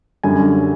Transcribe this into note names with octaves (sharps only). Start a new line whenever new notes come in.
F#2 D3 G3 G#5